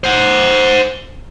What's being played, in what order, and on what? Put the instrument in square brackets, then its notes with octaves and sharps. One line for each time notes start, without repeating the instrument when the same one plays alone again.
[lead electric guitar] C5 F#5